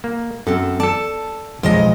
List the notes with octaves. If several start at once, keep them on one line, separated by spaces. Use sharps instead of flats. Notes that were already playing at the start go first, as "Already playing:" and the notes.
A#3
F#2 C4 A4
A4 D5 A5
B1 F3 G#3 D#5